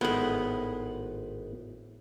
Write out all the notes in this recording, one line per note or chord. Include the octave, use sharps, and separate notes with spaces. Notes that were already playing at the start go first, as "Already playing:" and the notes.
G#1 A2 G#3 B3 B4 C5